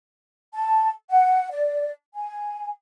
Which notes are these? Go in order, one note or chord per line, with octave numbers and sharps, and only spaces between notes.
A5
F#5
D5
G#5